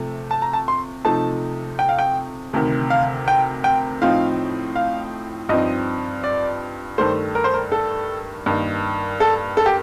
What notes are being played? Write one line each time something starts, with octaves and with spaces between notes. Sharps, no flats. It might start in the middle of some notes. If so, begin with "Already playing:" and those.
Already playing: C3 F3 A3
A5
A#5
A5
C6
C3 F3 A3 D#4 A5
G5
F5
G5
D2 C3 D#3
F5
G5
G5
A2 F3 C4 D#4 F5
F5
G2 F3 C4 D#4 D#5
D5
G2 D#3 A3 C5
A#4
C5
A#4
A4
G2 D#3 A#3 D#4
A4
A4
G4